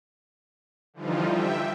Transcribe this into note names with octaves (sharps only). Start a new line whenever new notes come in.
D3 E3 F3 G3 D#4 F4
E5 G5